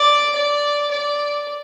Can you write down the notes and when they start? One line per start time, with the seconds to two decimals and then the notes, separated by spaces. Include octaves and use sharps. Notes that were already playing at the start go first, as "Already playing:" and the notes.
Already playing: D5
0.35 D5
0.91 D5